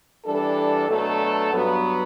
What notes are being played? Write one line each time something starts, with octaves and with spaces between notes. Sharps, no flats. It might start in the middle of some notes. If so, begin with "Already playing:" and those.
E3 G3 D4 A4
B2 F#3 A3 D4 A4
G2 F#3 B3